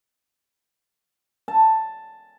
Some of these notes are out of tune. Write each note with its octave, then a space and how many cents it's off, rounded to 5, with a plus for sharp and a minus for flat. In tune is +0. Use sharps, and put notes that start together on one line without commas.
A5 +5